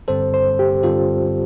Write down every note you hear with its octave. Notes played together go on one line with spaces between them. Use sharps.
G2 D3 G3 C4 A4 C5
C5
G4
G2 D3 G3 C4 F4 A4